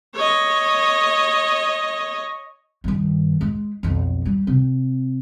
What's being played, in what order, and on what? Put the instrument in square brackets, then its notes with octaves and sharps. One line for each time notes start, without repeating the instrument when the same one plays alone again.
[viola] C#5 D#5
[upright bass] G2 D#3
G#3
B1 F2
G3
C3